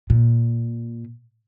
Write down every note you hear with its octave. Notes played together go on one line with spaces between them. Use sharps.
A#2